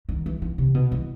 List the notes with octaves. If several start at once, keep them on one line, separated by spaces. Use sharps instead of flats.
D#3
E3
E3
C3
B2
E3